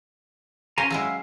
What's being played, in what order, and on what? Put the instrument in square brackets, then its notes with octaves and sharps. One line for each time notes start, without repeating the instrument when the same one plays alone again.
[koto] C#4 C5 [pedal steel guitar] F5 G#5 A#5
[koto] F#3 G#3 E4 [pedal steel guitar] F5 E6